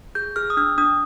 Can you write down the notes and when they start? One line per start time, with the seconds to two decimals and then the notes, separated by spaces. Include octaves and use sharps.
0.15 G#4 G6
0.36 G#4 F6
0.50 D#6
0.57 D4 F6
0.78 D4 D#6